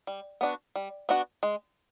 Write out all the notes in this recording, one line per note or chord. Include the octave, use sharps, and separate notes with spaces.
G3
B3 D4 F#4
G3
B3 D4 F#4
G#3